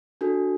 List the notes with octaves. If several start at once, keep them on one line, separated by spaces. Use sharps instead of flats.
D4 F#4 A4